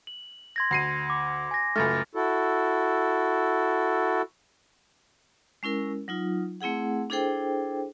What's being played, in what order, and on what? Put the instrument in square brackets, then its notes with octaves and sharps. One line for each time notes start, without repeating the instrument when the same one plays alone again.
[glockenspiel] F#7
C6 G#6 A#6
[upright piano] D2 C7 D#7
[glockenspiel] D6
G#5 A#6
[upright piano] C#2 F#2 A3 [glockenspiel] F6 A6
[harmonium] E4 F#4 A4
[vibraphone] G#3 C#4 E4 A#4
F#3 D#4 F4
A3 C4 E4 G#4 F#5
D4 E4 G#4 A4 C5 G5